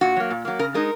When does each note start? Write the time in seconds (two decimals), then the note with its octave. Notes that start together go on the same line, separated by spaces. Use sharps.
0.01 A#2 F#4
0.16 F#3 A#3
0.30 A#2
0.45 F#3 A#3
0.59 C#3 A#4
0.74 G#3 D#4 A#4